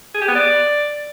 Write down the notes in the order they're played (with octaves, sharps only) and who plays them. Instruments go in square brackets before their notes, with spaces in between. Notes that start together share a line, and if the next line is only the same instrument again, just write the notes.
[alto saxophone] G#4
G4
B3
D5